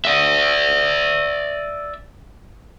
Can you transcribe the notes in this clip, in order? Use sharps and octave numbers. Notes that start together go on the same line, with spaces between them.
D5 E5